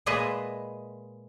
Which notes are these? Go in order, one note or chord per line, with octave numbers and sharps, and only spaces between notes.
A#2 G#3 G#4 B4 D#5 E5